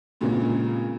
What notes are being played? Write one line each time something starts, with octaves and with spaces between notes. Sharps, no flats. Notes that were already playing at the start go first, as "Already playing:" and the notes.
G2 A#2 C#3 G#3 A#3 C4